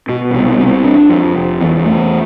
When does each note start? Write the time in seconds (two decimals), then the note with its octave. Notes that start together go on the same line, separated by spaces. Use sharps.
0.09 B2
0.33 C2
0.59 C3
0.84 D4
1.09 F2
1.35 F1
1.60 E2
1.85 A3